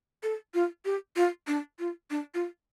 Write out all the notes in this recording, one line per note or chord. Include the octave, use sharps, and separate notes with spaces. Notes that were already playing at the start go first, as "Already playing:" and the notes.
A4
F4
G4
F4
D4
F4
D4
F4